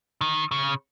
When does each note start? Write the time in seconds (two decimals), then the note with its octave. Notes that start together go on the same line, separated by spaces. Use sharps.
0.21 D#3
0.51 C#3